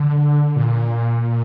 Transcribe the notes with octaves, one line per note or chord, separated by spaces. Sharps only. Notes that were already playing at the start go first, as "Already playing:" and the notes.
Already playing: D3
A#2